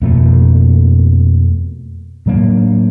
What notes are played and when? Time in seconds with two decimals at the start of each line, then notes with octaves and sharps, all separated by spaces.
0.02 F2 B2 A3 A#3
2.26 A2 F#3 A#3 D4